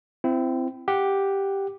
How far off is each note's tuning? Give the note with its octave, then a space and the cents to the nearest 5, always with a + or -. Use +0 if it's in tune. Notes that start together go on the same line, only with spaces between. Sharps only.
C4 -15 E4 +25
G4 +0 F#5 +0